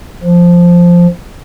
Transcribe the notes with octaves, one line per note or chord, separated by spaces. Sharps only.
F3